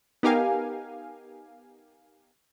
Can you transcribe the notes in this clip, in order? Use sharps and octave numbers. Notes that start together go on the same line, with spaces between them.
B3 D#4 G4 A#4 F5 G#5